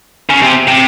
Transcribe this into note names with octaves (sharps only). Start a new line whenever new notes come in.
C#3
C3
C3